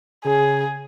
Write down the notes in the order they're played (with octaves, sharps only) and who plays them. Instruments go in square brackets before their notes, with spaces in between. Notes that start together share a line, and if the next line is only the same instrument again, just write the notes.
[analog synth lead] C#3 [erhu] G#4